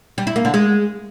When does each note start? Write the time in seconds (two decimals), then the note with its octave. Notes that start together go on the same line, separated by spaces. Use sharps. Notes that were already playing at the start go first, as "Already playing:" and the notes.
0.18 G3
0.27 E4
0.36 A#3
0.45 D3
0.54 G#3